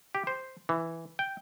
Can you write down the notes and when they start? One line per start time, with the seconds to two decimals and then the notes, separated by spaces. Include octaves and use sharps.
0.15 G4
0.27 C5
0.69 E3
1.19 G5